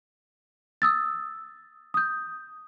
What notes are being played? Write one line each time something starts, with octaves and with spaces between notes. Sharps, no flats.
D#6 E6 A6
D#6 G6